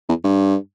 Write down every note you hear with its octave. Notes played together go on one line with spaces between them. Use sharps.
E2
G2